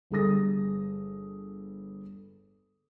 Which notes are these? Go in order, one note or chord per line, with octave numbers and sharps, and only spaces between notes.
G1 G3 G#4 A4 D#6 A#6